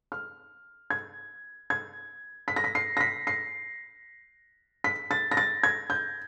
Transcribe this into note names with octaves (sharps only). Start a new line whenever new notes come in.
F6
G#6
G#6
B6
A#6
B6
C7
A#6
B6
C7
B6
A6
A#6
A6
G#6
G6